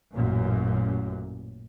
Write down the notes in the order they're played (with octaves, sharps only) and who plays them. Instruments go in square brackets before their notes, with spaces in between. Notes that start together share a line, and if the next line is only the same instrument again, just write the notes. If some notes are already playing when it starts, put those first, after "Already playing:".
[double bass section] A1 F#2 A#2